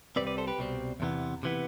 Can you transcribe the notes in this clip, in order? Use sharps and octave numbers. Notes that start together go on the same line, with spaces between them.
C2 B2 G3 C4 B4 D5
B4 D5
A4 C5
G4 B4
C2 B2 G3 C4
E2 C3 E3 B3
C3 E3 B3